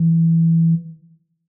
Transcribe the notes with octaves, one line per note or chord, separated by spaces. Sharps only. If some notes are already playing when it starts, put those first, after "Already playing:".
Already playing: E3